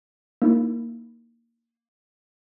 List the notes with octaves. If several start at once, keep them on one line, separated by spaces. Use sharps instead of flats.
A#3 D#4 E4